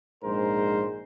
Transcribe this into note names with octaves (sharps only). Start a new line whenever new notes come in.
A#1 G#2 G#3 A#4 C5